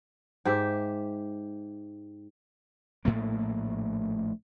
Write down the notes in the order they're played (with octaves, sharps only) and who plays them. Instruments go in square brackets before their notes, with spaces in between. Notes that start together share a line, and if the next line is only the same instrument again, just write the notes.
[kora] G#2 G4 E5
[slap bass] A#1 A2 A3 A#3